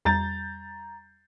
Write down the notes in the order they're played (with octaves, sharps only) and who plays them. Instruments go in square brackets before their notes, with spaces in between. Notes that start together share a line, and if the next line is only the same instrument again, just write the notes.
[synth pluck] E2 G3 [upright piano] A#5 G6 A6